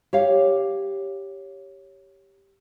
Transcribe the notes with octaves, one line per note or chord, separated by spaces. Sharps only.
G4 C#5 F5